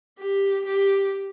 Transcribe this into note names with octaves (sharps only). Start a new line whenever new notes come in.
G4
G4